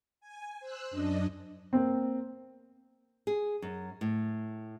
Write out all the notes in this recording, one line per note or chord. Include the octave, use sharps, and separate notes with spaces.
G#5
C5 E6 F#6
F#2 D4 D#5
A#3 C4
G#4
F#2
A2